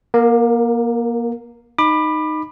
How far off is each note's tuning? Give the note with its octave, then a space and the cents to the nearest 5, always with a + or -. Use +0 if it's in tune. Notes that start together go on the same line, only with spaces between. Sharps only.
A#3 +30 A#4 -10
D#4 -10 B5 +0 D6 +30